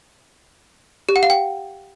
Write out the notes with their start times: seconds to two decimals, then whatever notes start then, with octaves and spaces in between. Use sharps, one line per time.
1.09 G4
1.16 F#5
1.23 F5
1.30 G5